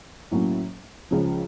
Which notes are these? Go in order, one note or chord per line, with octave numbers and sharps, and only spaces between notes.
A2 F#3 A#3 C#4
C#2 C#3 F3